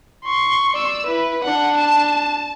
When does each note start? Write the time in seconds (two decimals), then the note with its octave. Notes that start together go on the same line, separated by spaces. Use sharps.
0.24 C6 C#6
0.74 D5 E6
1.07 E4 B4
1.44 D4 F#5
1.77 A5